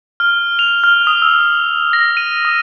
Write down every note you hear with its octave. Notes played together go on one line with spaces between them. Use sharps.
F6
F7
F6
D#6
E6
A#6
D#7
D#6